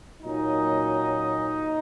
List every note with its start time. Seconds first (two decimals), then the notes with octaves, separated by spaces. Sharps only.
0.23 A#2 F#3 A#3 C#4 D#4